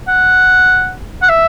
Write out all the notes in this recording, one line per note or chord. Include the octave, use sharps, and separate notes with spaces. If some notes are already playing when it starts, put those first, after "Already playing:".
F#5
F#5
E5